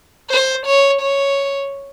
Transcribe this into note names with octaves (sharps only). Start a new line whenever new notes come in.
C5
C#5
C#5